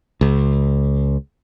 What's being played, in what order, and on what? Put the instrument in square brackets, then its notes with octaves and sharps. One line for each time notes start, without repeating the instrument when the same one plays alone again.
[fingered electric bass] C#2